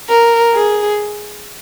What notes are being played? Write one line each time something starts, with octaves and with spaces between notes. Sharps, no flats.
A#4
G#4